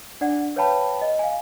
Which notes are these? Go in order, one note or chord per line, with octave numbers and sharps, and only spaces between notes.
D4 D5 F#5
B4 C#5 F5 G5 A5 B5
D#5
F5 G#5